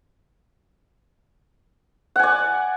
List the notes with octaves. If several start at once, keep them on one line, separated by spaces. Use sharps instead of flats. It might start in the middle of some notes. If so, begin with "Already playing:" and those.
D5 F#5 G#5